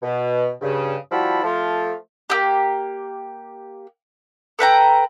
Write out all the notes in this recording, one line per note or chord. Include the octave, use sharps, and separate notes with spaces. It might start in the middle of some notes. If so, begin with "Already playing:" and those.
B2
G2 C#3
F3 G3 E4 F#4 A5 B5
F3 A3 F4
A#3 E4 G4
A4 B4 G5 A#5